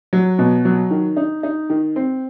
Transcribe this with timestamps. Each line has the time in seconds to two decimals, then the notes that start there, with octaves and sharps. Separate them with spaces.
0.13 F#3
0.39 B2
0.65 F#3
0.91 D#3
1.17 D#4
1.43 D#4
1.70 D#3
1.96 C4